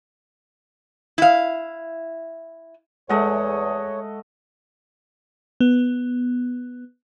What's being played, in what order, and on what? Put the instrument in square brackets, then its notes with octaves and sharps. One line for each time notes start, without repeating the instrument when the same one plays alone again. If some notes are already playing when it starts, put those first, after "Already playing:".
[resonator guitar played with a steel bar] E4 F5
[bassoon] E2 [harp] G#3 G#4 [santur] A3 D#5 F#5 [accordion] C#5
[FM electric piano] B3